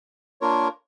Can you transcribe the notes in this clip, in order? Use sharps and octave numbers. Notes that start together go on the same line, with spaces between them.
A#3 D4 F4 A#4 C#5